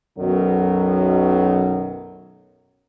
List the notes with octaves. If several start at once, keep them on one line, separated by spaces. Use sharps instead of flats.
B1 F#2 B2 D#3 F#3